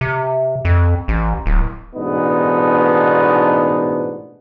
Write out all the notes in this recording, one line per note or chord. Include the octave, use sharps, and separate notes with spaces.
C3
F2
A1
D1
A1 G#2 B2 B3 D4 D#4